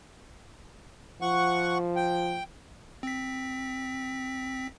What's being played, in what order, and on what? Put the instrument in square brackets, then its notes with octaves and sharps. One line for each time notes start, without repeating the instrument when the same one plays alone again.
[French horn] F3 [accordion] F#5 C#6
[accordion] G5
[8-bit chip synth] C4 B6